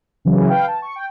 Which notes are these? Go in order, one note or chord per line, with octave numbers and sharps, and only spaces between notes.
C#3 E3 F#3
B4 F5 G5
A5
C#6
G5